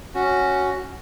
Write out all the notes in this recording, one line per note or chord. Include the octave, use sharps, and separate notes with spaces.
C#4 F#4